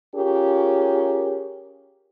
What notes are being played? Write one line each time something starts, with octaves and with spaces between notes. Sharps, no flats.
C#4 F4 G4 G#4 A#4